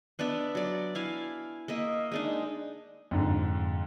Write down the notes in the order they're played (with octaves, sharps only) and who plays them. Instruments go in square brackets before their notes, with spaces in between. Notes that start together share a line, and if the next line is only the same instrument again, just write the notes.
[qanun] B3 D4 D5 E5
F#3 D5
E4 F5 G#5
A#3 D#5 E5
G#3 D4 D#4
[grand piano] F2 G#2 D3